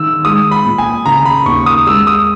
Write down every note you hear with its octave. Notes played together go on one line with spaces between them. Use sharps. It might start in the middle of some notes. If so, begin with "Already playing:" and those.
Already playing: D#3 E6
G#3 D#6
B5
A#2
G#5
C#3 A#5
B5
D#2 C#6
D#6
G#3 E6
D#6